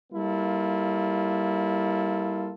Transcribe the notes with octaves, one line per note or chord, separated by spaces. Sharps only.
G3 A#3 E4 F4 A4